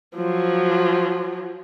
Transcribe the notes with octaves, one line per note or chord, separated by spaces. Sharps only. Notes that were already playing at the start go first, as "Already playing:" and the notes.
F3 F#3